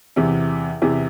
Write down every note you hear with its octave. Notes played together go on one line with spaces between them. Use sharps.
E2 C3 E3
E2 C3 E3